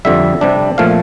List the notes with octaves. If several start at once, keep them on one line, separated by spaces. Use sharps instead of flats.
F2 D3 G3 E5
C3 G3 D4
A#2 F3 A3 F5